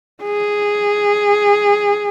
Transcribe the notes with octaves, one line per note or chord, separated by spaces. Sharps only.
G#4